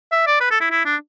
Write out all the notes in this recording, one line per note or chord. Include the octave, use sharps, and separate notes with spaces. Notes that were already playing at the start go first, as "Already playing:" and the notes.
E5
D5
B4
A4
E4
E4
D4